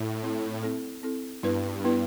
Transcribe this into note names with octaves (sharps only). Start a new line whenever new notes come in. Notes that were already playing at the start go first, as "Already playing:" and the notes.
Already playing: A2
C4 E4 A4
C4 E4 A4
C4 E4 A4
G2 B3 E4 B4
B3 E4 B4